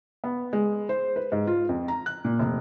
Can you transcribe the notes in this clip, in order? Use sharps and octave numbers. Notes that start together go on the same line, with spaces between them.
B3
G#3
C5
B4
G#2
F4
F2
A#5
F#6
A#2
F1